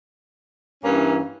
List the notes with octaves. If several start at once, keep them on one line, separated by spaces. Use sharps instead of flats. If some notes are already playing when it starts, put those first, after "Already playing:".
G2 E3 A#3 C#4